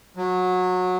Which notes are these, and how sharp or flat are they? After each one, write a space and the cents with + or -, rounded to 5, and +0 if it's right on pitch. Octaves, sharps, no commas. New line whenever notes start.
F#3 -20